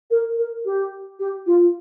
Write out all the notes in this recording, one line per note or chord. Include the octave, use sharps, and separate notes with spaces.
A#4
A#4
G4
G4
F4